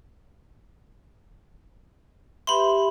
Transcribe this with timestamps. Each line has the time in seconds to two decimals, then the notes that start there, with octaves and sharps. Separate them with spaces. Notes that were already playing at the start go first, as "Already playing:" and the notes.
2.47 G4 B4 E5 B5 C6